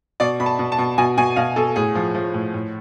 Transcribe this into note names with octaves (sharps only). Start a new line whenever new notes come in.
B2 D5
B2 B5
A5
B2
A5
B2
B2 G#5
B2 G#5
B2 F5
B2 A4
A2 G#4
F3
F3
A2
A2